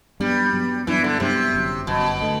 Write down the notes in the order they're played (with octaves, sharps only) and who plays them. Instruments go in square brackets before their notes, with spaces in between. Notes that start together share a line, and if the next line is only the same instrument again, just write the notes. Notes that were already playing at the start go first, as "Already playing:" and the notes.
[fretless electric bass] G2 F#3 B3 [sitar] G3
[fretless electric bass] G2 F#3 B3
[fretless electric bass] G2 F#3 B3 D4 [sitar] E3
[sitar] D3
[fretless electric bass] G2 F#3 B3 D4 [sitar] C3
[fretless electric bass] G1 F#2 F#3
[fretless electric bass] G1 F#2 F#3 [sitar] B2
[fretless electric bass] D3 A3